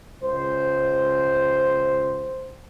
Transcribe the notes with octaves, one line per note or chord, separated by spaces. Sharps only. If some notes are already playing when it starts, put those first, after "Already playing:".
C#2 C5